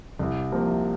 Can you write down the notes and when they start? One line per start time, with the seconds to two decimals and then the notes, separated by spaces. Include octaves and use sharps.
0.19 C2
0.52 C3 F3 A#3